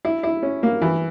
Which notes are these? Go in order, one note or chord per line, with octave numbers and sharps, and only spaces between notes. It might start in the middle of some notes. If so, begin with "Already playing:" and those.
E4
E4
C#4
A#3
E3